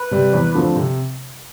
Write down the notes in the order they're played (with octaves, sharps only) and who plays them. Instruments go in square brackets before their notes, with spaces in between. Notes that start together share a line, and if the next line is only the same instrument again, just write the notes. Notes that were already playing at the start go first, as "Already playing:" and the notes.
Already playing: [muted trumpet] B4
[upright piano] C3 G3
E2
D3 F3 A3 C4
C3